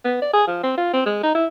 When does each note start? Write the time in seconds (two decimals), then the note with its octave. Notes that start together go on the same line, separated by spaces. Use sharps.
0.05 B3
0.22 D5
0.34 G#4
0.47 F3
0.63 C4
0.77 F4
0.93 C4
1.06 G#3
1.23 D#4
1.35 E4